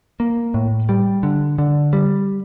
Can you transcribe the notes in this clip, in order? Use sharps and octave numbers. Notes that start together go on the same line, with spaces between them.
A#3
A2
G3
D3
D3
G3